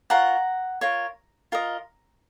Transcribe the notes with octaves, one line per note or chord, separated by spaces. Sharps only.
F4 A#4 C#5 F#5 A#5
F4 A#4 C#5
F4 A#4 D#5